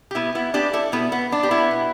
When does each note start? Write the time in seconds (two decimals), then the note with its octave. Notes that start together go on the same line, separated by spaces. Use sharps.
0.11 G4
0.15 B2 B3 E4
0.35 B3 E4
0.54 B3 D4 G4
0.73 E4 A4
0.92 B2 B3 E4
1.12 B3
1.31 B3 D4
1.43 G4
1.51 B3 E4
1.71 B2